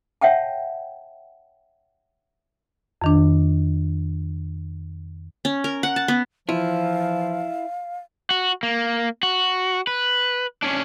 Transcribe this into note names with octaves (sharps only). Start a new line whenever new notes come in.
C#5 E5 F#5 G5 A5
F2 D#3 D4
C#4
A#4
F#5
A5
B3
E3 F3 E4 F4 F5
F#4
A#3
F#4
B4
C#4 D4